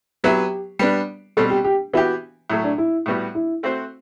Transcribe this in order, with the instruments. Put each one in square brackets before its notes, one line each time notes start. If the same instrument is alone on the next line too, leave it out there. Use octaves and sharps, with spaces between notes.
[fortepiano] F#3 B3 E4 B4 [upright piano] G4
[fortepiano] G3 B3 D4
[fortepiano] B2 G3 C4 [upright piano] A4
[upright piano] G4
G4
[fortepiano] E3 B3 E4 G4 [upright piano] F#4
[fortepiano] A2 F#3 A3
[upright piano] D4
E4
[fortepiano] A2 G3 B3 F#4
[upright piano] E4
[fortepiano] A3 C4 F#4 C5